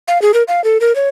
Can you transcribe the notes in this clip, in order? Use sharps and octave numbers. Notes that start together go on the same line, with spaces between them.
F5
G#4
A#4
F5
A4
A#4
C#5